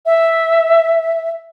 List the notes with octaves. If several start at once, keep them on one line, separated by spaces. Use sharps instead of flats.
E5